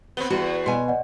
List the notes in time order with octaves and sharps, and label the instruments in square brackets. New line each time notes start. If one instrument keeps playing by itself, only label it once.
[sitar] B3 C4 [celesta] G7
[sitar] E2 [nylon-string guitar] F#4
[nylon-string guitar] B2 G#5 [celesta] C6
[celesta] D5 D#5 F#5